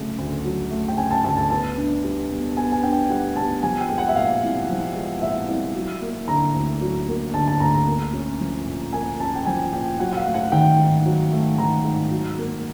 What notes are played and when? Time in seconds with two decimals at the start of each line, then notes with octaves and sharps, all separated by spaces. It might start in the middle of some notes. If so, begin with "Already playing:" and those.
Already playing: C#3 F#3 A3
0.18 D2
0.45 F#3
0.71 A3
0.88 G5
0.97 C#3 G#5
1.11 A5
1.24 D2 A5
1.37 A5
1.50 B3 A5
1.77 D4
2.04 G3
2.30 B2
2.57 B3 G#5
2.72 G#5
2.83 D4 G5
3.10 G3 F#5
3.36 B2 A5
3.63 F3 G#5
3.80 G5
3.89 G#3
3.98 F#5
4.08 E5
4.16 A#2 F5
4.43 C2
4.69 F3
4.95 G#3
5.22 A#2 E5
5.48 C2
5.75 F#3
6.01 A#3
6.28 D3 A#5
6.54 D2
6.81 F#3
7.08 A#3
7.34 D3 A5
7.47 A5
7.60 D2 A#5
7.74 A#5
7.87 A#3
8.13 C#4
8.40 F3
8.66 A#2
8.93 A#3 G#5
9.20 C#4 A5
9.36 G5
9.46 F3 G#5
9.72 A#2 G5
9.99 F#3 F#5
10.13 F#5
10.17 F5
10.25 A3
10.34 F#5
10.52 D#3 G5
10.78 G#2
11.05 F#3
11.32 A3
11.58 D#3 A#5
11.85 G#2
12.11 F#3
12.38 A#3